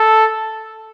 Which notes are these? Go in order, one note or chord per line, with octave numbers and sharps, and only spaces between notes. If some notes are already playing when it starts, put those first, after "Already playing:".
Already playing: A4